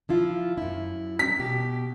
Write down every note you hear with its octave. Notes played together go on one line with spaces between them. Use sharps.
F3 E4 F4
F#2 E4
B6
B2 G4